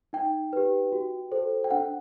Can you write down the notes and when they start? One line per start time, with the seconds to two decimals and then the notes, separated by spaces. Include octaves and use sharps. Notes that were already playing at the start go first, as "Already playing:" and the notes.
0.13 D#4 G5
0.53 G4 B4
0.92 F#4
1.32 A4 C5
1.64 G5
1.71 D4 F#5